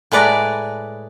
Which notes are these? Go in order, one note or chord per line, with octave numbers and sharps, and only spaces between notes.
A2 G#3 B4 D5 A#5